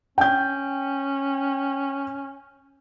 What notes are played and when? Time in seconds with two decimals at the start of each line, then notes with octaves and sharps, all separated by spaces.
0.18 C#4 G5 G6